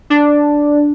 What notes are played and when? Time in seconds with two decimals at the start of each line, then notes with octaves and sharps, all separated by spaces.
0.10 D4